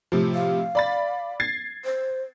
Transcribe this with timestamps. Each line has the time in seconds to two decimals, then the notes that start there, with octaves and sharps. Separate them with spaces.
0.12 A2 C3 F3
0.34 F5
0.75 D5 B5 A6
1.40 G#6 A6 C7
1.85 C5